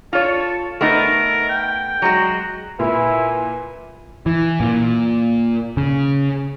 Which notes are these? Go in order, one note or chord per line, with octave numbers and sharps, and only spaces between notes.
F4 A4 C#5
A3 B3 D#4 A#4
G5
F#3 G#3 F#4
A#2 E4 B4 G#5
E3
A#2
C#3